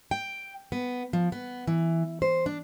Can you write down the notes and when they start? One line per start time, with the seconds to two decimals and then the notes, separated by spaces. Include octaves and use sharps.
0.11 G5
0.72 B3
1.13 F3
1.32 B3
1.67 E3
2.22 C5
2.46 D4